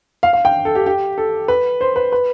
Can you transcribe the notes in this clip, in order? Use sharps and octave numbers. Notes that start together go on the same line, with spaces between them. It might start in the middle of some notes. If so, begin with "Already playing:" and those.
F5
F5
G5
A4
G4
G4
A4
B4
C5
B4
B4